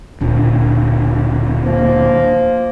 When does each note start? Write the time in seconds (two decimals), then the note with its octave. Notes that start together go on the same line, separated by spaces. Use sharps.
0.21 D1 A#2 D4
1.64 F3 A#3